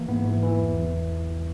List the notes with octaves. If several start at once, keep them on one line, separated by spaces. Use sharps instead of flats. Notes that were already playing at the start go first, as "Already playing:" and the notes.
Already playing: E3 A#3
G#2 B3
E3
E3
E2
E2